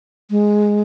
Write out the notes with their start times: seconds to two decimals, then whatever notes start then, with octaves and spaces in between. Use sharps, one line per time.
0.30 G#3